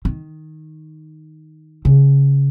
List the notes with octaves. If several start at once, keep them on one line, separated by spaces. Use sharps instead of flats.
D#3
C#3